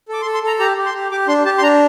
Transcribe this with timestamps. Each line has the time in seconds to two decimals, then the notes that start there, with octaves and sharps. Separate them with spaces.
0.09 A4 D6
0.22 C6
0.25 A4
0.34 C6
0.43 A4 A#5
0.59 G4 A#5
0.77 G4
0.86 C6
0.94 G4
1.11 G4 D6
1.28 D4 C6
1.45 G4 A5
1.58 C6
1.62 D4 A#5